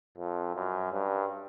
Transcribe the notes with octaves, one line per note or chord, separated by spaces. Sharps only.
F2
F#2
G2